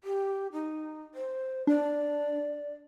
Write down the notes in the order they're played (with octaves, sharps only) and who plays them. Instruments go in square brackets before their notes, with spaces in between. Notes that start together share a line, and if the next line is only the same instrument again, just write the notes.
[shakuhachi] G4
D#4
C5
[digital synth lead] D4 [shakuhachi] D5